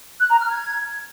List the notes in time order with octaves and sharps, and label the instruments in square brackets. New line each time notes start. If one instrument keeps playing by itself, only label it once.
[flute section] F#6
A#5
F6
G#6